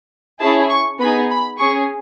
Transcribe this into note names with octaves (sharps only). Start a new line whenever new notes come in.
C#4 E4 G#4 A5
C#6
B3 D#4 G#4 B5
B5
C#4 G#4 C#6